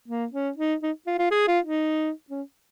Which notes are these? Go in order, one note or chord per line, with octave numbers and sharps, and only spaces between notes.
A#3
C#4
D#4
D#4
F4
F4
G#4
F4
D#4
C#4